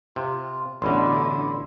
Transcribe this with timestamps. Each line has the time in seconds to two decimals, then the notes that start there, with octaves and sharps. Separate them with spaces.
0.16 C3 F4
0.82 A1 B2 D3 E4 C6